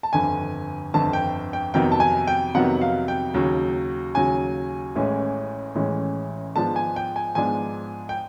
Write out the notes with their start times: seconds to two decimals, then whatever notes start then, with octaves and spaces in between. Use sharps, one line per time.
0.03 A5
0.13 G1 F2 D3 G#5
0.94 G1 F2 D3 A5
1.13 G5
1.53 G5
1.74 F2 C3 D#3 F#3 B3 G5
1.92 A5
2.00 G#5
2.27 G5
2.54 F2 C3 D#3 F#3 B3 F#5
2.81 F5
3.08 G5
3.34 D#2 C#3 F#3
4.14 D#2 C#3 F#3 G#5
4.96 A1 A2 E3 G#3 C#4
5.75 A1 A2 E3 G#3 C#4
6.56 G#2 F3 G#3 B3 D4 A5
6.76 G#5
6.96 G5
7.16 G#5
7.35 G#2 F3 G#3 B3 D4 G#5
8.09 G5